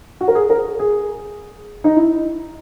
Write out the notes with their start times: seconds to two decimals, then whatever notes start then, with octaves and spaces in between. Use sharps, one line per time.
0.21 F#4
0.28 A#4
0.35 G#4
0.50 A#4
0.79 G#4
1.84 D#4
1.96 E4